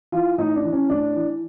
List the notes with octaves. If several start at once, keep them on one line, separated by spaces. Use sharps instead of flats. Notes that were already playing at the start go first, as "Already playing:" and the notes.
E3 F4
A2 D#4
D4
E3
C#4
A2 D4
E3